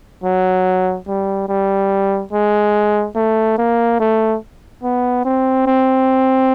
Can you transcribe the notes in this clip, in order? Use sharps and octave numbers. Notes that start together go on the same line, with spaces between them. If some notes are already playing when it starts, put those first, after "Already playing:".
F#3
G3
G3
G#3
A3
A#3
A3
B3
C4
C4